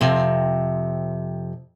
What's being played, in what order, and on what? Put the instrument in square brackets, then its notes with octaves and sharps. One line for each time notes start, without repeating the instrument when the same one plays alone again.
[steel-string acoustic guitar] F2 C3